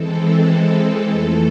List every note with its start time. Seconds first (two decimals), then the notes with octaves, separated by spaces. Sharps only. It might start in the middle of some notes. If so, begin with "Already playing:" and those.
Already playing: E3 G#3 C4 A4
0.15 A4
1.09 F2 E3 A3